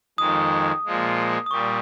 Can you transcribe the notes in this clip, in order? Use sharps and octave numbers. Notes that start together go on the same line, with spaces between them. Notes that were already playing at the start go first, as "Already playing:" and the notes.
F2 D#3 G#3 D#6
A#2 F3 G#3
D#6
A#2 G3 C#6